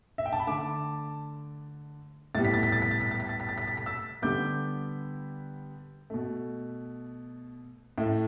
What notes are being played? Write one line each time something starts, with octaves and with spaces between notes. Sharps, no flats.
E5
G5
A5
B5
D3 A3 A5 D6
A2 G3 B3 A6
B6
A6
B6
A6
B6
A6
B6
A6
B6
A6
B6
A6
B6
A6
B6
E6 A6
D3 G3 B3 D6 G6
B2 A3
A2 A3